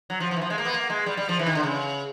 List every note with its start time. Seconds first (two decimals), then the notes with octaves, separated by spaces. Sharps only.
0.10 F#3
0.20 F3
0.31 F3
0.36 E3
0.41 F3
0.50 G#3
0.58 A#3
0.65 B3
0.74 A#3
0.90 G#3
1.06 G3
1.17 G3
1.29 F3
1.39 E3
1.46 D#3
1.55 D3
1.63 C#3